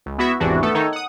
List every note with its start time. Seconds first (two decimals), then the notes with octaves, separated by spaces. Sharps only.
0.06 C#2
0.18 B3 E4 F#4 E5
0.40 G#1 E2 C3 E3 D4 F#4
0.62 A3 B3 A4
0.74 D#3 D#4 A4 C#5
0.92 F#5 D#6